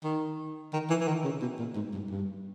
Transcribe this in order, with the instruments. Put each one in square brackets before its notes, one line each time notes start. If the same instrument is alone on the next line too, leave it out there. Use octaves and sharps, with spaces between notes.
[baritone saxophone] D#3
D#3
E3
E3
D#3
C#3
B2
A#2
G#2
G2
G2